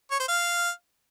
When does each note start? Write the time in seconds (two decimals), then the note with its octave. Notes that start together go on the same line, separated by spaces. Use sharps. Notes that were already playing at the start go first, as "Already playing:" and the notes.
0.11 C#5
0.20 C5
0.28 F5